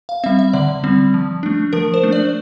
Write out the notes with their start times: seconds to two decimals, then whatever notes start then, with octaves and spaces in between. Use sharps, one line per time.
0.09 F5
0.24 G3 C4 E5
0.39 E5
0.53 D3 D5
0.84 G3 C4
1.14 F3
1.43 A3 D4
1.73 F3 A#4
1.94 C5
2.03 A3 D4
2.12 D5